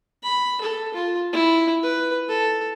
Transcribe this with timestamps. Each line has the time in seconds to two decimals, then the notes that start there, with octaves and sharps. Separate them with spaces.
0.23 B5
0.61 A4
0.94 F4
1.33 E4
1.83 B4
2.29 A4